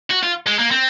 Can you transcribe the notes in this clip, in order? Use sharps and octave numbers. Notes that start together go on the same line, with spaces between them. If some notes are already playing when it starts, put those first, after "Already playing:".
F#4
F4
G#3
A#3
C4